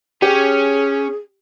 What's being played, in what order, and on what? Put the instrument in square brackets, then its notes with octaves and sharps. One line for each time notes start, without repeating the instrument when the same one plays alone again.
[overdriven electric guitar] C#4 [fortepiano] G4 [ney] G#4